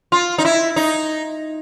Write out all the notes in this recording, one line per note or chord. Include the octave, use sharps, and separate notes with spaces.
F4
D#4
E4
D#4